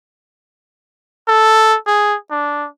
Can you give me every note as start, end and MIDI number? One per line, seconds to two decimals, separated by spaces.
1.28 1.77 69
1.87 2.16 68
2.31 2.67 62